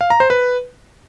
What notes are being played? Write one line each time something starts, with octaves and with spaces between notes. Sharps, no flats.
F5
A#5
C5
B4